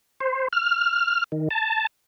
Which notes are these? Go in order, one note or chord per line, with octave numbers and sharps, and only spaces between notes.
C5
F6
D#3
A5